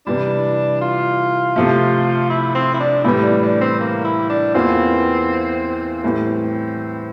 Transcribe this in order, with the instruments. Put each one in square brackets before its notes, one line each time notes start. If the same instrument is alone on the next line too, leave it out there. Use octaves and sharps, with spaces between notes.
[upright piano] C3 E3 G3 [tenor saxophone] D4
[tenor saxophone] F4
[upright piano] C3 F3 A3
[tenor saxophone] E4
C4
E4
D4
[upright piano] A2 E3 G3 [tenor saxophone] E4
[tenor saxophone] D4
D4
C4
A#3
E4
D4
[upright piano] E2 E3 A#3 F4 [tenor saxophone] C4
[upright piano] A2 E3 G3 [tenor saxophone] C4